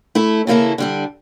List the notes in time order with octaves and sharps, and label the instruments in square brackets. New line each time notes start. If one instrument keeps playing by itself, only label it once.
[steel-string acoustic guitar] A3 E4 A4
C#3 E3 A#3 E4 A4
D3 G3 D4